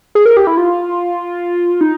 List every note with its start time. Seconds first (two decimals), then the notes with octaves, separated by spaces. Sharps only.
0.15 G#4
0.26 A#4
0.37 G4
0.47 E4
0.57 F4
1.81 D#4